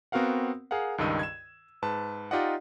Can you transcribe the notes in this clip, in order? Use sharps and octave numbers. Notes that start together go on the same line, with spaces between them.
B3 C4 F#4 A#4 F5 F#5
G#4 A#4 F5 F#5
C#2 G2 D#3 D#5 E6 D#7
G#6 E7
G#2 B4 A5
D#4 F4 G4 D5 D#5 F#5